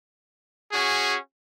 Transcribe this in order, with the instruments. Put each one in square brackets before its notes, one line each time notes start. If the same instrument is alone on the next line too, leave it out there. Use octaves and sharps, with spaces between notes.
[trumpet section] C#4 F#4 G#4